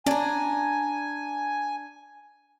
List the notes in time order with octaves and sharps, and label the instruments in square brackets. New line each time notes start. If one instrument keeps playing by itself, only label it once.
[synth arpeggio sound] C#4 D5 [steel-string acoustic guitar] D4 A#5 [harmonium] G#5